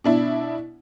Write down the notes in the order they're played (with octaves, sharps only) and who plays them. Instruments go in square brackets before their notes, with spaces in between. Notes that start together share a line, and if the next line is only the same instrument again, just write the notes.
[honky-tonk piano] B2 D4 E4